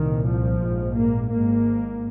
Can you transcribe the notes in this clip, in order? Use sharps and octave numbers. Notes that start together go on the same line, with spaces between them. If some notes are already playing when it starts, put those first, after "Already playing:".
Already playing: C2 A#2 D#3
F3
A#1 G#2
A#3
G#1 G#2 A#3